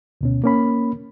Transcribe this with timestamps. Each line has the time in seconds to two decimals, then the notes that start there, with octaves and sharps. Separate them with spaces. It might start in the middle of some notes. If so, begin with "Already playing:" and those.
0.21 D2 B2 C#4
0.44 A#3 C#4 B5